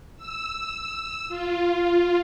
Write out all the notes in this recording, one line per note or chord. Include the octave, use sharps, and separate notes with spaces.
E6
F4